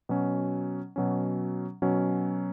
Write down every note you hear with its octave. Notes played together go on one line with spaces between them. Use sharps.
B2 F#3 C#4
B2 F#3 C#4
B2 F#3 C#4